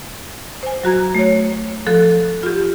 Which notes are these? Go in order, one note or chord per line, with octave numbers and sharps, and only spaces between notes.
C5 G#5
F#3 F#4 A#5 G#6
A3 C#5
F3 A4 F#6
F4 G4